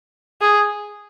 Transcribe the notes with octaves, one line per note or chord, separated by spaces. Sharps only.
G#4